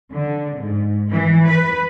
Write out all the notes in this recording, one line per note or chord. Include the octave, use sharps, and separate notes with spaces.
D3
G#2
E3
B4